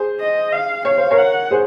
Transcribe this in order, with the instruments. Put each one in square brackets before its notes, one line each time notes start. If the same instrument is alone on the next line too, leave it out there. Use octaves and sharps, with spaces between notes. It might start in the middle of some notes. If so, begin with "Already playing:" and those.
Already playing: [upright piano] G#4 C5
[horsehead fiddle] D#5
F5
[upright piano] C#5 [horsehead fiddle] F5
[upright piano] C5
A#4 C#5
[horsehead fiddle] F#5
[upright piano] G#4 C5